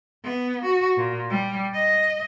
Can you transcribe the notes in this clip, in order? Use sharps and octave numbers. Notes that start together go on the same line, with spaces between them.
B3
F#4
A#2
G3
D#5